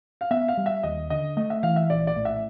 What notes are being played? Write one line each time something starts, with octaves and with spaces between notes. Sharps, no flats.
F5
B3 E5
F5
G3
E5
D#2 D#5
D3 D#5
A3 D#5
E5
E3 F5
E5
A#1 D5
D5
A2
E5